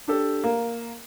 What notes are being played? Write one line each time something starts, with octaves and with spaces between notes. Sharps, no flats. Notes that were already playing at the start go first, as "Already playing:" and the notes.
D4 G4 A4
A#3